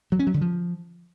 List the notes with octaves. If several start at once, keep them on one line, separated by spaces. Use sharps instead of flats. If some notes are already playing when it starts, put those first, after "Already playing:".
F#3
C#4
F#3
D3
F3